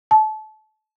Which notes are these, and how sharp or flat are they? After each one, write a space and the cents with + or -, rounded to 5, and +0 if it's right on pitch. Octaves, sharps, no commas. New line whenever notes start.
A5 -30